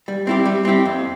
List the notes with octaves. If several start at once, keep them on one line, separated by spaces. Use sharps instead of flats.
G3
C4 E4 G4
G3
C4 E4 G4
F2